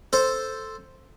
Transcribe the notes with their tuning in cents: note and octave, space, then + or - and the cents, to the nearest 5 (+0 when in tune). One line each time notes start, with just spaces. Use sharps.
A4 +0 C5 +0